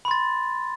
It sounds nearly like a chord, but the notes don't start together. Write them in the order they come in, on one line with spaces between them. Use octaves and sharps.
B5 C6 A6